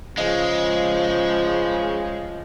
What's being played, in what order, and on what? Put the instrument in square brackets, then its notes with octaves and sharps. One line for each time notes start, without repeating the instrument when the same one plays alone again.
[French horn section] C#3 [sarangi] F3 [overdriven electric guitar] G#3 [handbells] D#5 F5